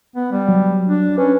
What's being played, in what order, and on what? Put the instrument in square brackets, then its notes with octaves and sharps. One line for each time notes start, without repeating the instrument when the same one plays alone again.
[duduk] B3
G3
[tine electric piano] F#3
[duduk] D4
[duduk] C#4 [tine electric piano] B4